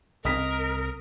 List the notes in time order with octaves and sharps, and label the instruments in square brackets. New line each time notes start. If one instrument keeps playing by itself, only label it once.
[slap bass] C2 C4 [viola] A#4 [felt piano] D#5 D#6 B6